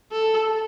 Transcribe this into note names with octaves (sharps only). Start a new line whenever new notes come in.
A4